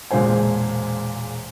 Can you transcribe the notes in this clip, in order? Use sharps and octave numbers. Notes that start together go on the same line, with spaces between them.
E1 A#2 G#3 C5 G#5